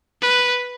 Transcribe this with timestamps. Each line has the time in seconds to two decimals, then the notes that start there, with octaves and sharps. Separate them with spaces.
0.22 B4